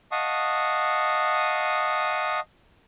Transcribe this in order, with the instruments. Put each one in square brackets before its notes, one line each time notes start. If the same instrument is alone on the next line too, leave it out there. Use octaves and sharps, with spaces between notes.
[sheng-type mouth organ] D#5 F5 F#5 A5 C#6 D#6